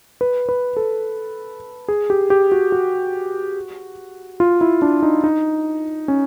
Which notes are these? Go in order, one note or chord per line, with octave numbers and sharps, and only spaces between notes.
B4
B4
A4
G#4
G4
G4
F#4
F#4
F4
E4
D4
D#4
D#4
C#4